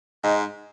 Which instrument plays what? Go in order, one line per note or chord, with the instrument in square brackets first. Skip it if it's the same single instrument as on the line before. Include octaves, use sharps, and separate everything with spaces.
[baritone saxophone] G#2 [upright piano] D#4